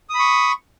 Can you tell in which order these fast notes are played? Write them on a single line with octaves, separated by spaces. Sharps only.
D#6 B5 C#6